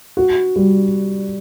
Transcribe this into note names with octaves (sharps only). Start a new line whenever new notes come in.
F#4
G3